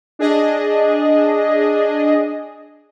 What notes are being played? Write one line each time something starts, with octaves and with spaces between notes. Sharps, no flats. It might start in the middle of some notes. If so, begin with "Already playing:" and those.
D4 G#4 D#5